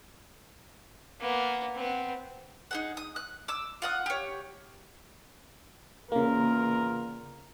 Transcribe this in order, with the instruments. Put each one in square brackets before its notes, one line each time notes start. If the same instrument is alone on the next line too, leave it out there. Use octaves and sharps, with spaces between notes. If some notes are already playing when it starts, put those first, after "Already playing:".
[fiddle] A#3 B3
B3 C4
[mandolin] D#4 G#4 F#5
D#6
F#6
D6 E6
F4 F#5 D#6
G4 C#5
[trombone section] E2 F4 A#4 [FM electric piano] C#3 A#3